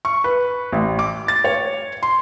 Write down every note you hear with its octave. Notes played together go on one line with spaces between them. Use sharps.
C#6
B4
A1
D6
A6
C#5
C6